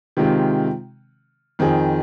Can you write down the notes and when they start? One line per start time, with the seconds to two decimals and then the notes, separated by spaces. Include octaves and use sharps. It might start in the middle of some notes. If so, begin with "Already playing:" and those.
0.17 C3 D#3 G#3 C4 F4
1.59 F2 D#3 C4 G#4